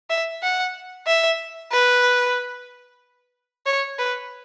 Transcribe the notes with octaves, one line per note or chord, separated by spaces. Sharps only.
E5
F#5
E5
B4
C#5
B4